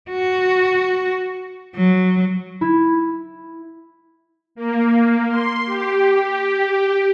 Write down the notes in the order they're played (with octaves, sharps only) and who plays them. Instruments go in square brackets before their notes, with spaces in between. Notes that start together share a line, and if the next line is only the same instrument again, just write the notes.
[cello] F#4
F#3
[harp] E4
[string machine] A#3
C6
G4